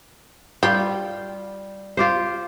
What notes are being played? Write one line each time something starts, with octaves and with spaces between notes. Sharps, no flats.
G3 F4 G4
F4 G4 C5